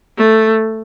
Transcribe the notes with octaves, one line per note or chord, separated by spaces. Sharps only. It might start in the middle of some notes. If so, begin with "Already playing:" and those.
A3